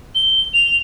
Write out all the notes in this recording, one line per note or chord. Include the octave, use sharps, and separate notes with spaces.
G7
F7